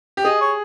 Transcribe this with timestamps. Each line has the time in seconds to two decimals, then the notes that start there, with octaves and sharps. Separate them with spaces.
0.17 G4
0.25 G#4 D#5
0.41 C#5